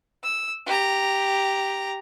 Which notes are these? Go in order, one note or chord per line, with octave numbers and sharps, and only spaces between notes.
E6
G4 A#5